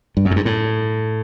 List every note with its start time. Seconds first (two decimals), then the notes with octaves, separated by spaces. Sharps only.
0.17 G2
0.25 F#2
0.31 G#2
0.36 G2
0.45 A2